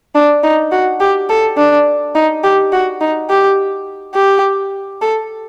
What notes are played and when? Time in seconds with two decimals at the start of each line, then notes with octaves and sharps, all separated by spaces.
0.15 D4
0.43 D#4
0.72 F#4
1.00 G4
1.30 A4
1.57 D4
2.15 D#4
2.43 G4
2.73 F#4
3.01 D#4
3.30 G4
4.15 G4
5.01 A4